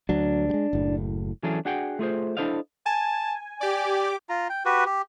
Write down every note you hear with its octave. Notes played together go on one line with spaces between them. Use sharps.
D2 F#3 D4
G3 G#3
F#1 A2
E3 F#3 C#4 D4 G#4 A4
D4 F#4 G#4 F#5 G5
A3 F4 G#4 C5
D4 E4 A4 C5 D#5 F5
G#5 A5
G4 D5 D6
F4 A#5
G5
F#4 G4 B4
G4